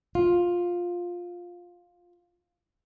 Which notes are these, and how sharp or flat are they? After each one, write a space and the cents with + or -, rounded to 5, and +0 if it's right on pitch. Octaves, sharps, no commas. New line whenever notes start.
F4 +10